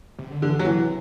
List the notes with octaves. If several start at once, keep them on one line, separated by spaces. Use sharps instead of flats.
C3
D3
D3 E3
D3
F#3
C3 E3